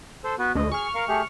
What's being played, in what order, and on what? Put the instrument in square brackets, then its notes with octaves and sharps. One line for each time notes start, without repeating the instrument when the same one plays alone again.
[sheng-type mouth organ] A4 C5
B3 F#4 B4
[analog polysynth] D2 [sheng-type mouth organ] D#5
[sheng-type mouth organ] G#4 [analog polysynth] C#6 F6
[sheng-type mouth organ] A#4 F5
A3 G4 G#4